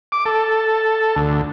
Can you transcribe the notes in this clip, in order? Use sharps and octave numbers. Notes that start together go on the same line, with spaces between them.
D6
A4
D2